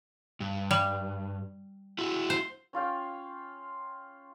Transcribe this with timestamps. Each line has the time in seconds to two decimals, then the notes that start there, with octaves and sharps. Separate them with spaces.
0.40 G2
0.71 G3
1.98 E4 F#4
2.30 C5
2.73 C#4 F4 F5 G5